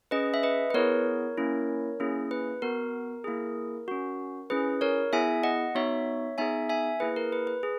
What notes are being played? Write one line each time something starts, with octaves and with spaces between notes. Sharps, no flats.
C#4 G#4 B4 D#5
E5
B4 D#5
B4
B3 E4 G#4 A#4 C#5
A#3 C#4 E4
A#3 C#4 E4 G#4
B4
B3 F#4 A#4
A#3 E4 G#4
C#4 F#4
C#4 E4 G#4 B4
A#4 C#5
B3 E4 G#4 E5 G#5
D#5 F#5
B3 D#4 F#4 C#5 E5
B3 D#4 G#4 E5 G#5
E5 G#5
A#3 E4 G#4 B4
A#4
B4
B4
G#4